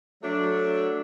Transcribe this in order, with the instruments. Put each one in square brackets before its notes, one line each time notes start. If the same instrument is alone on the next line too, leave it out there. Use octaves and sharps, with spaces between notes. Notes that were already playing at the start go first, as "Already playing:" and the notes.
[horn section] F#3 A3 D4